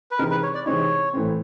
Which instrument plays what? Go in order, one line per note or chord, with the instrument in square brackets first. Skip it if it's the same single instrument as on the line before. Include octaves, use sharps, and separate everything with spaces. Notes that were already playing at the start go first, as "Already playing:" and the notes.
[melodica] B4
[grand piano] C3 E3 G#3 C4 D#4 [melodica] A#4
[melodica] B4
C#5
D5
[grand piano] C3 E3 G#3 C4 D#4 [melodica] C#5
[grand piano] A2 E3 A3 C4